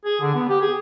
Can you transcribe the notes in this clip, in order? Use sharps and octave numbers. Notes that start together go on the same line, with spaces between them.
G#4
D3
B3
G4
G#4